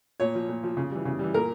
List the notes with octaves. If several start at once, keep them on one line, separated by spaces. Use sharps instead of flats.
A#2 C#5
F3
A#2
F3
C#3
E3 G3
C#3
E3 G3
A#2 A#4